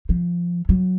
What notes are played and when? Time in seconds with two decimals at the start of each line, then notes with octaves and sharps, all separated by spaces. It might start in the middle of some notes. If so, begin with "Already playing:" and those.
0.09 F3
0.69 F#3